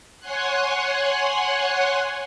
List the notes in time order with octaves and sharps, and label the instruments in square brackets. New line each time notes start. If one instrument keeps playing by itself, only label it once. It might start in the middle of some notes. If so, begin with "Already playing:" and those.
[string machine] C#5 F#5 G#5 C6 F#6